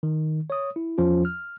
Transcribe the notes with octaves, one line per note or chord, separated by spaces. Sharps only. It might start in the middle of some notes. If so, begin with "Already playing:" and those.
D#3
C#5 D#6
E4
E2 F3 C#4 F4
F6